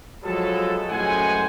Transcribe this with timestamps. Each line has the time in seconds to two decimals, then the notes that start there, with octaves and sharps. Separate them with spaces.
0.23 F3 F#3 G#3 A3 B3 A4
0.89 F#2 A2 G#3 C5 F#5 G#5